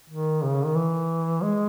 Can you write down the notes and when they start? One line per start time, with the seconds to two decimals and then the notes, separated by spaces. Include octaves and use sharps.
0.10 D#3
0.43 C#3
0.65 D#3
0.75 E3
1.42 G#3